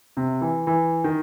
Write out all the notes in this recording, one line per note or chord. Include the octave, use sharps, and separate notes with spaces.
C3
E3
E3
D#3